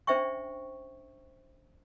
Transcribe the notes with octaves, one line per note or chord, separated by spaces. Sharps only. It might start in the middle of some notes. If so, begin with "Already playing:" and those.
C#4 D4 C5 E5 G5 C#6